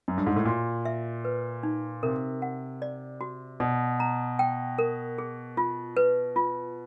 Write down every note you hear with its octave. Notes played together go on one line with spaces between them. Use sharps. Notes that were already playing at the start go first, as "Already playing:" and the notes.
F#2
G2
G#2
A2
A#2 F#4
E5
B4
D#4
C3 A#4
F#5
D5
F#4
B2 D5
A#5
G5
A#4
G#4
F4
B4
F4